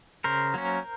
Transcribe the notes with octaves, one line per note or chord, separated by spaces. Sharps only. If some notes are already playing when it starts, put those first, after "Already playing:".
C#3 A#4 C5
F#3 A#3 C#4